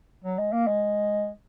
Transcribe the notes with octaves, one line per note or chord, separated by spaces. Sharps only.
F#3
G#3
A#3
G#3